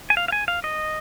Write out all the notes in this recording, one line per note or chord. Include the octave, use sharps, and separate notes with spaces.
G#5
F5
F5
G#5
F5
D#5